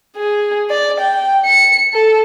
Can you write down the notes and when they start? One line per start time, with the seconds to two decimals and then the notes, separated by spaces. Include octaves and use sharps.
0.16 G#4
0.70 D5
1.00 G5
1.45 C#7
1.94 A4